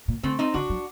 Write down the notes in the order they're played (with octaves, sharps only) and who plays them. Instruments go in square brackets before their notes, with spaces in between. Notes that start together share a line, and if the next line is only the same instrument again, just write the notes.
[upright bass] A#2
[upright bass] D3 [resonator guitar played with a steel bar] A3 C4
[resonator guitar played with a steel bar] C4 D#4
[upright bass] D3 [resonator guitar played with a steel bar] D4 F#4
[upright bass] F#3